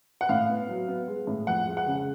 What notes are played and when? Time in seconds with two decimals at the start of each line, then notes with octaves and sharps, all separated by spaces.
0.21 F#5
0.29 A2 F5
0.49 B3
0.69 F#3
0.88 B3
1.08 G#3
1.27 A2
1.47 F2 F#5
1.67 G#3
1.77 F#5
1.87 C#3